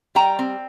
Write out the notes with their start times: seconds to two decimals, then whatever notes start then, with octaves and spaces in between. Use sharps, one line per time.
0.15 G3 G5 A#5
0.39 C4